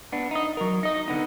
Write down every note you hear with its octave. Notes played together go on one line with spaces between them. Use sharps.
B3 D4
D#4 D#5
F#3 A#4
D#4 D#5
D3 B3 D#4